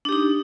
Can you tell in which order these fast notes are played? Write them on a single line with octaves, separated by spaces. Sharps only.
D4 G4 D#4